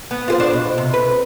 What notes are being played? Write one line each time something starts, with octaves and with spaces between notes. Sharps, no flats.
B3
F4 G#4 C5
D4 C5
B2
C3
B4